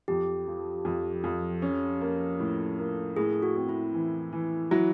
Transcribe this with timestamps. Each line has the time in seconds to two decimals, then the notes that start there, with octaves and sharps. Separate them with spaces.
0.08 F2 G4
0.47 F3
0.85 F2
1.24 F2
1.62 C#4
2.01 A#3
2.40 A2
2.79 A#3
3.16 A2 G#4
3.42 F#4
3.56 C4
3.69 E4
3.94 E3
4.33 E3
4.71 F#3 E4